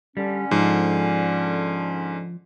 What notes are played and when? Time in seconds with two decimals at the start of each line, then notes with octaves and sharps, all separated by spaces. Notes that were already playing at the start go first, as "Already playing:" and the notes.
0.17 D3 G3 C#4
0.51 G#2 F3